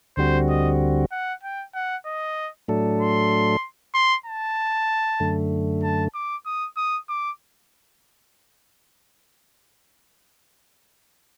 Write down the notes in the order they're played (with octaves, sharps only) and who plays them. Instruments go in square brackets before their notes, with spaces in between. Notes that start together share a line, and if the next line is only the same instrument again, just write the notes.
[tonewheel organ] D2 D3 G3 C4 F#4 [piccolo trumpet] C5
[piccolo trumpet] D#5
F#5
G5
F#5
D#5
[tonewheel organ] A2 F#3 A3 D4 A4
[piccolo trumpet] C6
C6
A5
[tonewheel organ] F#2 D3 A3
[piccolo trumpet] A5
D6
D#6
D#6
D6